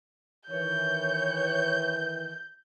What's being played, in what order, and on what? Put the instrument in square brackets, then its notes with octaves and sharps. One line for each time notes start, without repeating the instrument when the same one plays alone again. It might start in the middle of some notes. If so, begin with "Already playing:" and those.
[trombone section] D#3 E3 [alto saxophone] C#5 [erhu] G6